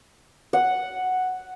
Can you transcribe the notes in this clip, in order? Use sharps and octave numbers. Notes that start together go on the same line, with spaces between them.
F#5